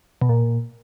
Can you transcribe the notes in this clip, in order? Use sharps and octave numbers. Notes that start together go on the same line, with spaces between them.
B2
A#2